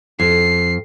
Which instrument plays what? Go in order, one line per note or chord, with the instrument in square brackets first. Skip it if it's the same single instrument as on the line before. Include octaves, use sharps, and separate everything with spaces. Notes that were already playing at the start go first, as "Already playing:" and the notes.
[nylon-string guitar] F2 [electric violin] C7